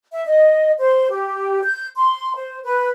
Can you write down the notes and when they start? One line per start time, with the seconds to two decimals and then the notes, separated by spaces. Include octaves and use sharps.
0.13 E5
0.26 D#5
0.79 C5
1.10 G4
1.63 G6
1.97 C6
2.35 C5
2.65 B4